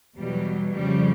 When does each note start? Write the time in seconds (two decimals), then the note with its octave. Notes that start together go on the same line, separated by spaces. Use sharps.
0.17 E2 B2 F#3 G3
0.73 F2 C#3 F3 G3